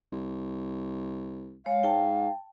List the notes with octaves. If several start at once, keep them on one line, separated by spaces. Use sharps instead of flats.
C2
G#3 C#5 F5
G#2 G5 A5